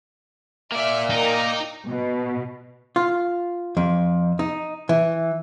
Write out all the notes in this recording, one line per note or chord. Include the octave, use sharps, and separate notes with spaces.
A#3 D5 E5 F6
D#4 A#4 G5 A#5
B2
F4
F2
D#4
E3